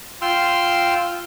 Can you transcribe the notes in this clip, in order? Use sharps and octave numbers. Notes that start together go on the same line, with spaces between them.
F4 G5 C6 E6 F6